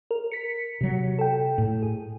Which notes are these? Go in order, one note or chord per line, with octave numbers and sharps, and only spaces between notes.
A#4
B6 C#7
C3 F#3
A4 G5
A2
G#4